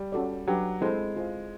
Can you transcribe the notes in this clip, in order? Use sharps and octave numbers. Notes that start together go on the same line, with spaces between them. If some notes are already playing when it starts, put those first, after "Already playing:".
Already playing: G3
C#4 F#4 A4 D5
F#3 D4 G4 B4
G#3 C4 E4 A4 C5
F4 G#4 C5 F5